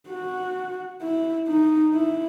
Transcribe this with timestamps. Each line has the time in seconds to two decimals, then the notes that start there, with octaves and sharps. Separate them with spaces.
0.10 F#4
1.02 E4
1.48 D#4
1.94 E4